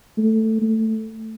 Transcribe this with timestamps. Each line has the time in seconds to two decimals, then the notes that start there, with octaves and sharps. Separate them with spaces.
0.18 A3
0.62 A3